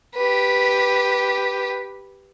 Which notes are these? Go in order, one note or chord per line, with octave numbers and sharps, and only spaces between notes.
G4 B4